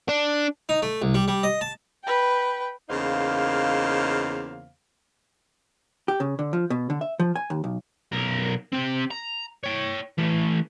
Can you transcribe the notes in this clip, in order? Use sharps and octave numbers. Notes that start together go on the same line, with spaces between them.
D4
D#4
A3
C2
G3
G3
D#5
A5
B4 G5
E2 C#3 A#3 D#4 C5 F5
G4
C#3
D3
F3
B2
D3
E5
F3
G#5
D#2
B1
B1 A#4
C4 G4
A#5
C#5 G5
E3 A3